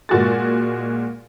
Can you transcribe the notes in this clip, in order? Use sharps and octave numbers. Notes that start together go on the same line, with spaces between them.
A#2 G#3 F#4 G#4 A6